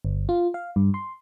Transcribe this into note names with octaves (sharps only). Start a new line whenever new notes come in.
G1
F4
F5
G2
C6